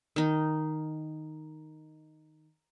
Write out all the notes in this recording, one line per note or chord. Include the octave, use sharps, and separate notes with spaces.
D#3 D#4